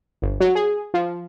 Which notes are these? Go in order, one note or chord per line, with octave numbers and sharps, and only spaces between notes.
G1
F#3
G#4
F3